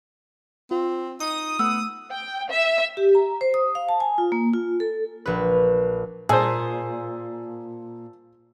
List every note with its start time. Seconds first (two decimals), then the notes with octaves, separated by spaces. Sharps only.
0.71 C4 F4
1.20 D#4 D#6
1.59 A3 B3 E6
2.12 G5
2.51 E5
2.97 G4
3.15 A#5
3.41 C5
3.54 D#6
3.75 F5
3.89 A5
4.00 G#5
4.18 F4
4.32 A#3
4.53 F4
4.80 A4
5.26 A#1 B4
6.29 A#2 G#4 C5 A5 E6